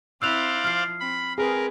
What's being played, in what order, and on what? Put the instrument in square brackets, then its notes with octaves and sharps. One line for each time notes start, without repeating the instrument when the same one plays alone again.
[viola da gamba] C4 E4 [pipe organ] C5 D5 F5 [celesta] E6 F#6 F7
[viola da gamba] F3 [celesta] F6 C7
[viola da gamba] C4 [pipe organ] B5
[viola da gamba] C4 B4 [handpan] G#4 [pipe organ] A#4